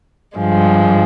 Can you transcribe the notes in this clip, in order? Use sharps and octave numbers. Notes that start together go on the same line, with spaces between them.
G2 F3 G#3